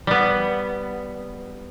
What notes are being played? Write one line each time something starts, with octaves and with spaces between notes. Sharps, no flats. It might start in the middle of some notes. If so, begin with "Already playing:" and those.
G3 B3